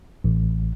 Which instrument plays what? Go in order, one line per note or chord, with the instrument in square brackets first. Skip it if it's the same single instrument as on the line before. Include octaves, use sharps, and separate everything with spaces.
[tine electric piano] A1